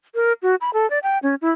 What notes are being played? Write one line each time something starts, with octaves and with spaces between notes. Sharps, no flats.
A#4
F#4
B5
A4
D5
G5
C#4
E4